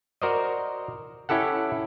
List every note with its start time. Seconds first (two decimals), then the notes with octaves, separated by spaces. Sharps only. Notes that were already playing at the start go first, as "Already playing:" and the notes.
0.22 F#4 A#4 C5 D5 D#5
1.29 C#4 E4 G4 A4 F#5